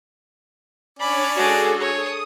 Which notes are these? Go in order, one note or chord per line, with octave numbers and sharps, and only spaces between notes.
C#4 D4 C#5 D5 B5 D6
G#3 D4 F#4 G#4 A4
C#5 D#6